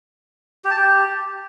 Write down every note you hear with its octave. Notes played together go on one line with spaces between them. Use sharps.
G4
A5
G4